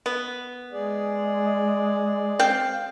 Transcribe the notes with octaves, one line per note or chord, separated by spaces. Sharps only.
B3
G#3 G#4 D5
C4 F5 G5